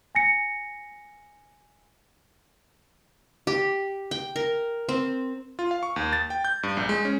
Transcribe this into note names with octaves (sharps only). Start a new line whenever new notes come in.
G#5 A#6 C#7
G4
G5
A#4
C4
F4
F5
C#6
D#2
A6
G5
G6
G2
A#1
G#3
C#4